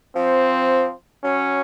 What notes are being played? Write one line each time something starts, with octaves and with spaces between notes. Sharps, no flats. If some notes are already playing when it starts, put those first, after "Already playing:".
F3 C4
F#3 C#4